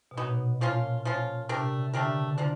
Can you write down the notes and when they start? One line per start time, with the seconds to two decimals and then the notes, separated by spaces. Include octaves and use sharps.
0.11 B2
0.17 A#2 F#3 B3 D#4
0.31 B2
0.61 A#2 F3 A#3 C#4 F4
1.05 F3 A#3 C#4 F4
1.49 C3 A3 D4 G4 A#4
1.64 C3
1.79 C#3
1.93 D3 A3 D4 G4 A#4
2.04 C#3
2.15 C#3
2.27 D3
2.37 D3 F3 A#3 D4